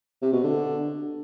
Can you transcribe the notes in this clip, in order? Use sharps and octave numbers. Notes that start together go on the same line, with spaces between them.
C3
B2
D3